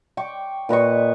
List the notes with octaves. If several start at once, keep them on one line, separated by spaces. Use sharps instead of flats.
G5 C#6 D6
A#2 B4 D#5 C#6